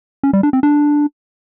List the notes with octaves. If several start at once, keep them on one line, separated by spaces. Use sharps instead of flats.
C#4
G3
D4
C4
D4